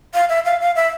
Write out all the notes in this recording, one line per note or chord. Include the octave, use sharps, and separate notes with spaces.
F5
E5
F5
F5
E5